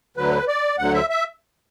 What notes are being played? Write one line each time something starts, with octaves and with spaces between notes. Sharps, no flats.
D2 D3 F#3 B4
D5
D2 D3 F#3 F#5
E5
E5